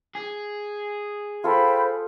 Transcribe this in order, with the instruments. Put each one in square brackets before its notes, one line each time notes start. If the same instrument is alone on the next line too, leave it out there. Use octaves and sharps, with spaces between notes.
[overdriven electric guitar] G#4
[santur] F4 A4 [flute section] C5 G5 B5